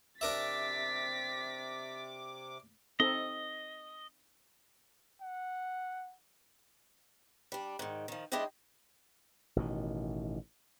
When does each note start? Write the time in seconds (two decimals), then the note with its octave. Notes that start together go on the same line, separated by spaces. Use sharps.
0.21 C3 D4 A#4 E5 D6 A6 B6
3.00 C4 D#4 A4 D#5
5.21 F#5
7.52 G3 D4
7.79 G#2 D#3
8.08 D#3 F3
8.32 G#3 D4 E4 C5 D#5 G5
9.56 A1 B2 D#3